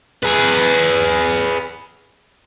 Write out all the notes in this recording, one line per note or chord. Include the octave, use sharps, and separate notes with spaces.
G#4 B4